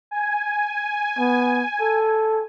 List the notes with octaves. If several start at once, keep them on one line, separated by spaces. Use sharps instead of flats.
G#5
B3
A4